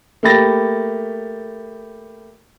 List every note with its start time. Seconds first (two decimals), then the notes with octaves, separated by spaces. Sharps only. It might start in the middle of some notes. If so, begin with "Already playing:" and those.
0.23 A3 A#3 G4 B5 A6 A#6